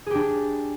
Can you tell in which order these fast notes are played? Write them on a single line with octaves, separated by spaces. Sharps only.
G#4 G4 D4